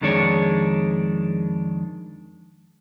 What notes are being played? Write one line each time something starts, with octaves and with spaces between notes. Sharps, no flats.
F2 D#3 G#3 D4 C#5